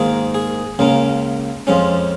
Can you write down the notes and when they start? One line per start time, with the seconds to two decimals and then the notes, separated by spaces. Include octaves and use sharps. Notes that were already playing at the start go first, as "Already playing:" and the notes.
Already playing: G#2 D#3 A#3 G#4
0.35 G#4
0.79 C#2 C#3 A#3 C#4
1.67 F2 F3 G#3 C#4